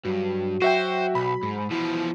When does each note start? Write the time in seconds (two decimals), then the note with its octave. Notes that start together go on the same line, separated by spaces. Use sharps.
0.05 G2 F#3
0.62 F#4 C5 E5 G5
1.15 B1 B5
1.43 G#2
1.71 B2 E3 F3